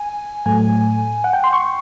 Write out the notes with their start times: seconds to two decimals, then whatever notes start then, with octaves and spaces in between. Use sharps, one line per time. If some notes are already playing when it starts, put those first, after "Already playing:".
Already playing: G#5
0.46 A2 F#3 A3 G#5
1.24 F#5
1.33 G5
1.44 C6
1.53 C#6